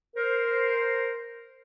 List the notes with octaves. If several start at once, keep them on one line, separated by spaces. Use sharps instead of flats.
A#4 C5